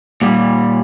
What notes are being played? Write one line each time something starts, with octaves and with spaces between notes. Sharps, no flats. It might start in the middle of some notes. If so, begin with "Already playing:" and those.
A#2 G3